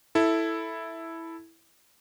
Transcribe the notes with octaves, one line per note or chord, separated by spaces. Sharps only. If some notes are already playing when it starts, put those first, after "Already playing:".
E4 A4